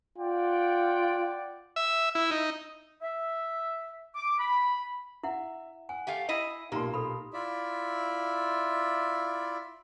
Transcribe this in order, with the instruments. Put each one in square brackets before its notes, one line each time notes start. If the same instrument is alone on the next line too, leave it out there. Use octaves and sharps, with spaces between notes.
[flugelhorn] F4 [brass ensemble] D5 F#5 G5
[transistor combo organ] E5
E4
D#4
[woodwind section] E5
D6
B5
[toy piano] E4 F#5 [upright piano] E5
[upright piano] F#5 [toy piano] G#5
[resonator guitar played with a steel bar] A3 G4 F5
E4 D#5
[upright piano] B1 A#2 C6 [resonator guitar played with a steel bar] A#3 [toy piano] G4
[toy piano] A4 B5
[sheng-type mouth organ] E4 F4 D5 E5